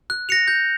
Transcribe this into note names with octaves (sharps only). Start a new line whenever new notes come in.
F#6
A#6 C#7 F7
G6